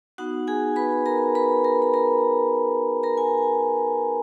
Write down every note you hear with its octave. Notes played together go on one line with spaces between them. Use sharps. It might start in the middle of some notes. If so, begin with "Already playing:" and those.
B3 D#4 F#4 F#5
G#4 G#5
B4 B5
A#4 A#5
B4 B5
A#4 A#5
B5
A#4 A#5
A#4 A#5
G#5